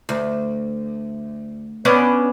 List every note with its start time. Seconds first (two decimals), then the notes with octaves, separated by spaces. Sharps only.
0.09 D2
1.85 B3 C#4 D4